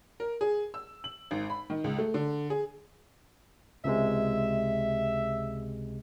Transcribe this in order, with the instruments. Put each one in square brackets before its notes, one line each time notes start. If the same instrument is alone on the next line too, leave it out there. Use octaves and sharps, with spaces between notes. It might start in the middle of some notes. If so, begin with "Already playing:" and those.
[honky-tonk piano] A#4
G#4
E6
F#7
G#1
B5
D#3
C#2
A3
D3
G#4
[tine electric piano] C#2 C3 G#3 [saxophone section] E5